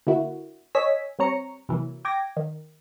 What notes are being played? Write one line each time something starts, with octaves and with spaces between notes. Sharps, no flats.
D3 A#3 E4 F#4
C#5 D#5 G#5 E6 B6
G3 C4 C#5 A#5 C#7
C3 E3 F#3 A#3
G5 D6 G#6 A#6
D#3